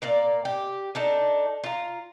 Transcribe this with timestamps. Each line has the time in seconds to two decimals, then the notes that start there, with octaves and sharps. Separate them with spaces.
0.02 A#2 A#3 D5
0.45 G4
0.95 D4 D#4 A4
1.64 F4 A#5